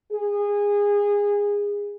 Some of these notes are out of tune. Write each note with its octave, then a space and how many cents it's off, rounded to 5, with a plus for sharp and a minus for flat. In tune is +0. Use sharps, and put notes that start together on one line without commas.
G#4 -20